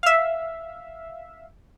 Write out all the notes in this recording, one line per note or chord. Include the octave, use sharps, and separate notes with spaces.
E5 F5